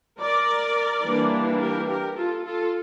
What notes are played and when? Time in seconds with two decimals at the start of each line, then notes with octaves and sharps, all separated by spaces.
0.19 A#4 D5
1.04 E3 G3 A#3 D4
1.60 G4 A#4
1.88 G4 A#4
2.16 F4 A4
2.45 F4 A4